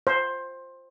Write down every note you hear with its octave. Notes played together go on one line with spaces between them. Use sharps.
C5